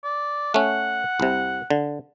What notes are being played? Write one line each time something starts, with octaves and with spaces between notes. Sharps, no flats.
D5
A3 C#4 F#5
C2 C3
D3